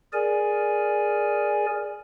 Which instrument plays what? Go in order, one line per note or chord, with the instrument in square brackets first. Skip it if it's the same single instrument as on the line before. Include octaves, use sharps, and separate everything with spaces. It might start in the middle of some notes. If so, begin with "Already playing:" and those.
[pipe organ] G#4 A#4 D5 G#5